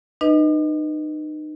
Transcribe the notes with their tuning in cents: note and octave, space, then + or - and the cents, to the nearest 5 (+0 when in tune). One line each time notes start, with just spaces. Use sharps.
D#4 -30 B4 +0 D#5 +10